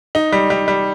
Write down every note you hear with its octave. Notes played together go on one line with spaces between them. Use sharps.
D#4
G3
G3
G3